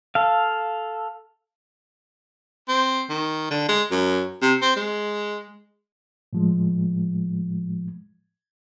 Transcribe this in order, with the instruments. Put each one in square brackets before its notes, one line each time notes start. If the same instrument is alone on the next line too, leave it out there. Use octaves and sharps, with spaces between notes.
[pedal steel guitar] A4 F5
[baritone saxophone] C4
D#3
D3
G#3
F#2
C3
C4
G#3
[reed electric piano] A2 F3 G#3